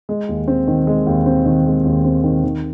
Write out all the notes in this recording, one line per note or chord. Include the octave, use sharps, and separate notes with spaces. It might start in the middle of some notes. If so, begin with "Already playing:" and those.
G#3
D#2
C4
D#3
G#3
D#2
C4
D#3
G#3
D#2
C4
D#3
D#3